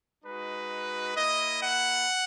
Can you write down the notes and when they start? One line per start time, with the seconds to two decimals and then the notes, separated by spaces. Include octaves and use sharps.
0.24 G#3 D#4 F#4 B4
1.15 A#3 E4 D#5
1.61 F#5